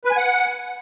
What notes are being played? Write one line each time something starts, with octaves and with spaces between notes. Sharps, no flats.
B4
G#5
F#5